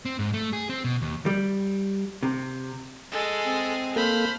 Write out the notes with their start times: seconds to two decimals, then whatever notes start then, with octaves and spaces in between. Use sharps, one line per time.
0.05 C4
0.19 G#2
0.33 A3
0.53 G#4
0.69 C4
0.84 B2
1.02 D#2
1.26 G3
2.23 C3
3.12 G#3 G#4 A4
3.45 C4
3.96 A#3 A4 C5 B5 F6